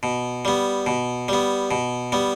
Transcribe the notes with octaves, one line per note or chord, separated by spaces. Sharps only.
B2
G3 B3
B2
G3 B3
B2
G3 B3